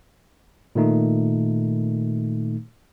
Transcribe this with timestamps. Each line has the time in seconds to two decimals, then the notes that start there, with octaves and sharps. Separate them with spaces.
0.75 A#2 D#3 A3 D#4